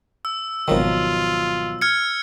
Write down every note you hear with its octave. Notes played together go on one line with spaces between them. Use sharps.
E6
G#1 B2 D#3 F3 F#3 F4
F6 G#6 C#7